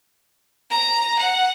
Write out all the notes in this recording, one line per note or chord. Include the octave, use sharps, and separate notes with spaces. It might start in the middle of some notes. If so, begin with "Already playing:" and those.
A#5
F#5